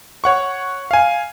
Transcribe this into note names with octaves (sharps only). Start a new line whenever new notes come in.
C#5 F#5 C#6
F5 G#5